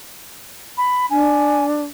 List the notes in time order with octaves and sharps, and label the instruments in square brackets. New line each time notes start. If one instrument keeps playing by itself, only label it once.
[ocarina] B5
[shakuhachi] D4 [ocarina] G#5